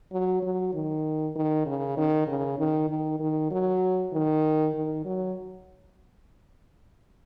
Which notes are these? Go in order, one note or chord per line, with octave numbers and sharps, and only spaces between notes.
F#3
F#3
D#3
D#3
C#3
D#3
C#3
D#3
D#3
D#3
F#3
D#3
D#3
F#3